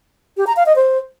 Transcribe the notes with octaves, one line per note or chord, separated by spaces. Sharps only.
G4
A#5
F5
D#5
C5